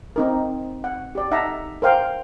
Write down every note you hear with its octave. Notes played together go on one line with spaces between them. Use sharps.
C4 D#4 A#4
F#5
G4 D5
D#4 E5 F#5 A5 A#5
A#4 C5 F5 G5